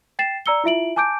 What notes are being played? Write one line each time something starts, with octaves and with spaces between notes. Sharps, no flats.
G5 A6 C7 E7
D5 A#5 E6 C#7 G7
E4 F4 E5 D7 F#7
G#5 A5 D6 G6 D7